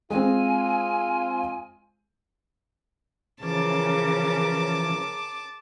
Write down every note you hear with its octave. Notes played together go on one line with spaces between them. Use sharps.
G#3 C4 F4 G#5
C#3 E3 F3 C#4 A#4 A5 D6